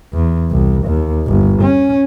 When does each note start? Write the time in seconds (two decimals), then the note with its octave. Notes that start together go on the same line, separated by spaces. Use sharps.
0.13 E2
0.51 C2
0.86 D#2
1.27 G1
1.62 C#4